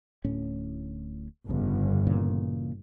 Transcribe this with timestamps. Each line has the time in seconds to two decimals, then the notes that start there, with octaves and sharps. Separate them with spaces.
0.24 D1 A2 C#4
1.49 G1 F2 C#3
2.07 A#2 C#3 E3